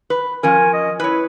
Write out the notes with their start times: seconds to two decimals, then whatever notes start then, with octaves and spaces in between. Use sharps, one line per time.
0.10 B4
0.43 F3 C#4 A#4 G#5
0.73 D#5
1.00 E4 B4 C#5